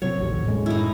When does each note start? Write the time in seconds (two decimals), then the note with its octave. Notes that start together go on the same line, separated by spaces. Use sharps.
0.02 C3 F#3 C#5
0.18 A1 D#2
0.44 F#2 A2 G#3
0.66 D#4 E4